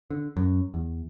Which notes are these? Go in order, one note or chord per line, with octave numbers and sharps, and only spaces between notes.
D3
F#2
E2